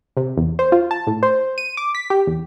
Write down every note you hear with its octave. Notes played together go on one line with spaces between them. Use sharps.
C3
E2
C5
F4
A5
A2
C5
D#7
D6
B6
G4
E2